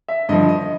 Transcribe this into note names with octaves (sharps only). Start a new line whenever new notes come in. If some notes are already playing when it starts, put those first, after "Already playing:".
E5
G2 D3 F3 D#5
D#5